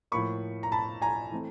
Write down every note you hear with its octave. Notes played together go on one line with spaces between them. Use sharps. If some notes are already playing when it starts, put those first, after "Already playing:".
A2 F3 A#3 B5 C#6
A#5
A5 B5
G#5 A#5
E3 A3 C4